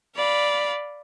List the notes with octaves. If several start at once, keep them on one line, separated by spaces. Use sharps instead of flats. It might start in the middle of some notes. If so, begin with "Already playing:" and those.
D5 F5 B5